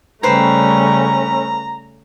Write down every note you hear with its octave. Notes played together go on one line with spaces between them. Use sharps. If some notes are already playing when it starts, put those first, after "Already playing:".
C#3 G3 A3 C#4 B4 C5 G5 A#5